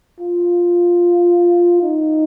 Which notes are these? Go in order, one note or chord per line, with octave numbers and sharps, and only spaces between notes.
F4
D#4